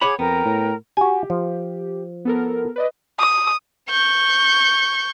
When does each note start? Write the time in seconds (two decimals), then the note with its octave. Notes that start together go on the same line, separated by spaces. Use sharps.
0.01 G#4 C#5 F#5 B5 D6 G#6
0.19 F2 B3 A#4 G5 A#5
0.45 A2
0.97 F#4 G4 G#5
1.30 F3
2.25 B3 A4 A#4
2.76 B4 D5 D#5
3.19 D#6
3.90 C#6 G6